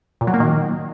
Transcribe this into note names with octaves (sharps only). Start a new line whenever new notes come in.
A#2
F#3
A#3
D#3